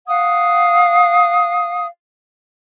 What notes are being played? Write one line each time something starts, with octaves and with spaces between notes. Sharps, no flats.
F5 F#5 D#6